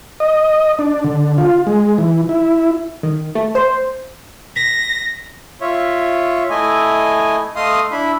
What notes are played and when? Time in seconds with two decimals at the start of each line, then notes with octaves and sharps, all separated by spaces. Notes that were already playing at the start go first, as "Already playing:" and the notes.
0.20 D#5
0.79 D4
1.04 D3
1.38 F4
1.67 G#3
1.98 E3
2.29 E4
3.03 D#3
3.35 A3
3.55 C5
4.56 A#6 B6
5.61 F4 C#5 E5
6.50 A3 E4 D#5 G#5
7.56 A3 D#5 F5 C6 D#6
7.92 D4 E4 E5 B5